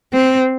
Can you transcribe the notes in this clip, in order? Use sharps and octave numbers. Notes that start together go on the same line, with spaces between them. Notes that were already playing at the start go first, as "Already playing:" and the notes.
C4